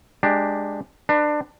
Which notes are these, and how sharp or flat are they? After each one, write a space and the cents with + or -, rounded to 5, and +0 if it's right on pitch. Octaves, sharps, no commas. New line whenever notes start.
G#3 +0 D4 +15 G4 +0
D4 +25 B4 +0